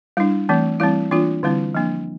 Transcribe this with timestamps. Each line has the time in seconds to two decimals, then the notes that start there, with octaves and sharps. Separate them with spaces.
0.17 G3 D4 E4
0.49 E3 A3 C4
0.80 E3 G3 C4 E4
1.11 E3 A#3 D4 F4
1.43 D3 G3 C4 E4
1.75 F3 A#3 D4